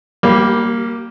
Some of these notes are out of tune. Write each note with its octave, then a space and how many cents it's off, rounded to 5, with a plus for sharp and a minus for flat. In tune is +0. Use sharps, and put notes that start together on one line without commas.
G3 +0 A#3 +0 G4 -45